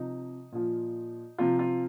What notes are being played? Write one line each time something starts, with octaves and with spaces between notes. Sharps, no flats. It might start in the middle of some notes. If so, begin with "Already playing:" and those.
Already playing: C3 F3 D#4
A#2 F3
C3 F3 F4
F4